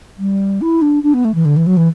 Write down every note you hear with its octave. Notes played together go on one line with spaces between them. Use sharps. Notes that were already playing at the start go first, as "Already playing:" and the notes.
G3
E4
D4
D4
B3
A3
E3
D3
E3
F#3
E3